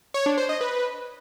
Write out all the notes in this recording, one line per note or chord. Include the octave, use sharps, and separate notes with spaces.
C#5
D4
C5
D#5
B4